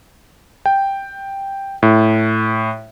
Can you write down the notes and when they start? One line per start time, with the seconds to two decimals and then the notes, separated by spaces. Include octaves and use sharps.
0.66 G5
1.83 A2